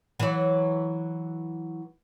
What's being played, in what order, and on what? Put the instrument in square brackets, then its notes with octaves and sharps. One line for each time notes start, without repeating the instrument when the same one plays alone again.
[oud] E3 F#3